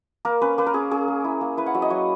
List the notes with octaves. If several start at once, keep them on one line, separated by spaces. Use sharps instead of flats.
A#3 A#4
C#4 B4
A#3 B4
A#4
C#4 G#4
C#4 G#4
A#3
E4
A#3
E4 B4
F#5
F#3 E5
D#5
F#3 C#5